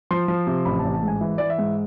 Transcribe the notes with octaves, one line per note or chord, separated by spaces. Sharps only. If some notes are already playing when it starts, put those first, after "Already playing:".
F3 C6
F3
C3
A1 B5
A5
A1
A5
G#2 G#5
E3
E3 D5
E5
G#2